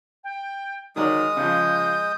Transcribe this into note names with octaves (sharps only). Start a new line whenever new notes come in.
G5
D#3 F#3 G#3 D5 D#6 F6
C#3 F3 G6